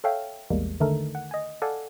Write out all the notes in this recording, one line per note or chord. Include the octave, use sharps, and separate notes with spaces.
A4 C#5 E5 F5 G5
A#1 E2 G3 G#3 A#3
D3 D#3 A3 D#4 A4 A#4
F#5
D#5 G#5
A4 D5 F5 F#5 G#5